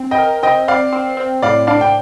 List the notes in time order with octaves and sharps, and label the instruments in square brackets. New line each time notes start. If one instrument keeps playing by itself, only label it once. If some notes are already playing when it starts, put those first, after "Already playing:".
Already playing: [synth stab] C4
[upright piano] D#5 G5
[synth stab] A#4
[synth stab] C4 [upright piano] D#5 G5
[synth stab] C4 [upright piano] D5 F5
[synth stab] C4
C4
[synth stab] A2 [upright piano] D5 F5
[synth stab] D4 [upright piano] D5 F5
[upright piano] G5